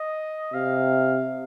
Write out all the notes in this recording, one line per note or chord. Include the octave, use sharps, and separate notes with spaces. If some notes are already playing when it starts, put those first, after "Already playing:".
Already playing: D#5
C3 F5